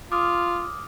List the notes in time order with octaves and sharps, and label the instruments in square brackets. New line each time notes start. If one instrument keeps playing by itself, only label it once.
[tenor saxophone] F4 [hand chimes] D6 D#6 F6